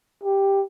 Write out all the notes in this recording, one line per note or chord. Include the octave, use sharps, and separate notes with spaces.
G4